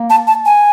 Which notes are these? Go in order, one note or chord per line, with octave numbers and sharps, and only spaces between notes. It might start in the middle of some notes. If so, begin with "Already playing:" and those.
Already playing: A#3
A5
A5
G#5